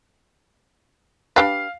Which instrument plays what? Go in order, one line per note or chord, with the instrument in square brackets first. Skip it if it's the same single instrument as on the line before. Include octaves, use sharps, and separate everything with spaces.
[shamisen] D4 G4 B4 [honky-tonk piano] F5